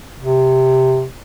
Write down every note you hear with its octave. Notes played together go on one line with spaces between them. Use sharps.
C3